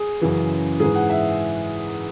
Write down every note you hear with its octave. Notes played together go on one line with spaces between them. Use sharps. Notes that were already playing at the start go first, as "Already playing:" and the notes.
Already playing: G#4
F#2 C#3 E3
G#2 E3 G#4
F#5
E5